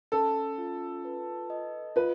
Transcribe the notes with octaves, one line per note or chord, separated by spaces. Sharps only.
C#4 A4
F4
B4
D#5
F4 B4